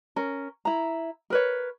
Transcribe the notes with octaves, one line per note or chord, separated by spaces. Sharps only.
C#4 A#4
E4 A#5
A#4 B4 C#5